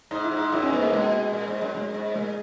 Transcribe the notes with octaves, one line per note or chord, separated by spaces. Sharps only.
G#2 D#4
E4
G#2
D#4
F#2 E4
C#4
G#2 B3
A#3
B2 G#3
A#2
G#2
F#2
F#2 G#3
G#2
A#2 G#3